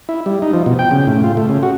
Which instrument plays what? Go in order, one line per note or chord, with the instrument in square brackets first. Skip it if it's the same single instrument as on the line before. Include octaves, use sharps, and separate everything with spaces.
[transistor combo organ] E4
G3
D#4
F3
B2
G5
C#3
A2
F4
A3
C#3
F#4